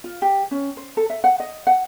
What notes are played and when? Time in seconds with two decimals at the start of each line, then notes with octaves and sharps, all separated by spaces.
0.04 F4
0.22 G4
0.51 C#4
0.77 C5
0.97 A4
1.10 E5
1.24 F#5
1.40 D#5
1.67 F#5